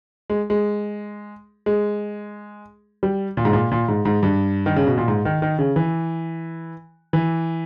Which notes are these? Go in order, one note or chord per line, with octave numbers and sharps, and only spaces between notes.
G#3
G#3
G#3
G3
A#2
G#2
A#2
A#2
G#2
G#2
G2
D#3
C#3
B2
A#2
G#2
D#3
D#3
C#3
E3
E3